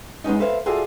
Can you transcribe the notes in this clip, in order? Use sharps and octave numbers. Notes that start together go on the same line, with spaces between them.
G#3 B3 C#4 D#4
A4 B4 C5 E5 F5
F4 F#4 G#4 A4 D5 E5